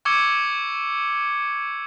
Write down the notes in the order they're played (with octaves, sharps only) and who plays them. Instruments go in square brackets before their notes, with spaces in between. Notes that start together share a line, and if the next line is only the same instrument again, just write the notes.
[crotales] C#6 D6 E6 G#6 C#7 G7